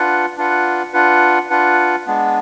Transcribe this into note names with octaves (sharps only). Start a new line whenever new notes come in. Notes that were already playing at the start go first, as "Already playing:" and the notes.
Already playing: D4 F4 B4 F#5
D4 F4 B4 F#5
D4 F4 B4 F#5
D4 F4 B4 F#5
G#3 B3 D4